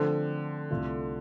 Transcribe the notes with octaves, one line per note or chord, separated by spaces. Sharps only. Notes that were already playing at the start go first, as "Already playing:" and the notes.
Already playing: D3 F3 A3 C4 F4 C5
C2 C3 A3 F4